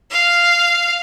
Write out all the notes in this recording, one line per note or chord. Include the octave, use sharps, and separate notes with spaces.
F5